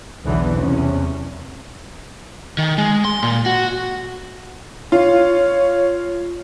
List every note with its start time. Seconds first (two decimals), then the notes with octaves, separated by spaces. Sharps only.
0.24 B1 E2 D3 E3 F#3 B3
0.56 E2 C3 C#4
2.58 D#3
2.78 G#3
3.05 C6
3.23 A#2
3.46 F#4
4.92 F4 C#5